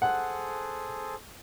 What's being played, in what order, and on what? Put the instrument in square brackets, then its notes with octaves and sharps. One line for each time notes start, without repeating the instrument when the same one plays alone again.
[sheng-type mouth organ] G#4 A4 C5 [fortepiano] F#5